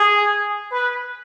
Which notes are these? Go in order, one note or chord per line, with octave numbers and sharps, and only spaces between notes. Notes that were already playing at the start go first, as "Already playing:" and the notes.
Already playing: G#4
B4